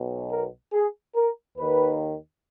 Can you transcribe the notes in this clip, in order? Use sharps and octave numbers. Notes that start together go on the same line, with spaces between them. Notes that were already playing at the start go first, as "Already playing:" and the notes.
Already playing: B1 B2
A#4
G#4
A#4
D#2 D#3 B4